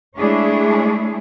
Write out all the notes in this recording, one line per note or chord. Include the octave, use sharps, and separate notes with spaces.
G#3 A3 D4 E4 G#4 C#5